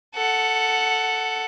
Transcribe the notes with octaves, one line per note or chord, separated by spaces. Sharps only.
A4 F#5